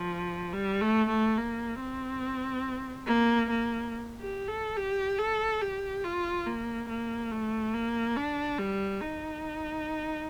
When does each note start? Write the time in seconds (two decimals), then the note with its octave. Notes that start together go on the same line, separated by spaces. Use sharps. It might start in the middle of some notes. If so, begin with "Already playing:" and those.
Already playing: F3
0.53 G3
0.81 A3
1.09 A3
1.38 A#3
1.80 C4
3.07 A#3
3.50 A#3
4.21 G4
4.48 A4
4.77 G4
5.19 A4
5.61 G4
6.04 F4
6.46 A#3
6.89 A#3
7.31 A3
7.74 A#3
8.16 D4
8.59 G3
9.01 D#4